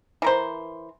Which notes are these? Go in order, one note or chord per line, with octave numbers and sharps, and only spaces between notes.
E3 A#4 C5